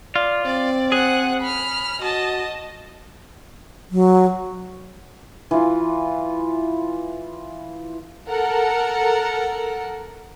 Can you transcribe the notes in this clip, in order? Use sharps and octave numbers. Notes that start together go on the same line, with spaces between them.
F4 D5
C4 D5
G#4 F#5 F#6
B5 F6
F#4 D#5 A5
F#3
E3 F4
A4 A#4 F#5